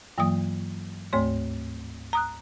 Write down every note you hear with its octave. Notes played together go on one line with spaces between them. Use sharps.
G2 E3 F#3 A#3 D#6
D2 G#2 A3 C#5 C6
A#5 D#6 F#6